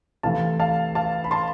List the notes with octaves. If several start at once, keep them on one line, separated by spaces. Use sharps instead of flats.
C3 E3 A3 F5 A5
F5 A5
F5 A5
B5
A5 C6